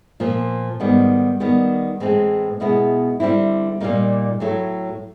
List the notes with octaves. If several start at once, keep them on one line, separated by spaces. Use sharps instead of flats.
A#2 F3 A#3
G#2 D#3 G3 B3
D#3 G3 B3
A2 E3 G#3 C4
B2 G#3 B3 E4
D3 G3 C4 E4
A#2 G3 A#3 D#4
A2 F#3 A3